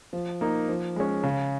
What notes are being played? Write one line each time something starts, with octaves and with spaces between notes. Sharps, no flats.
F3
A#3 D#4
F3
G#3 C#4
C#3